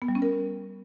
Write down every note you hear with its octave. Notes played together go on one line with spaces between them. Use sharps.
B3
G3
C#4
A#4